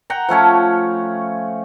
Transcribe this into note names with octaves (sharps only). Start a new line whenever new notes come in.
F#5 G5 A#5
F3 A3 C#4 C#5